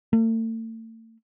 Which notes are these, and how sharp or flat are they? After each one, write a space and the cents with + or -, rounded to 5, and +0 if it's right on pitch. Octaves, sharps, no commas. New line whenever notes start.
A3 +40